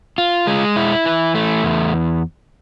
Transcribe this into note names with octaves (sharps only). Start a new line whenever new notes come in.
F4
G#3
E4
E3
A3
E2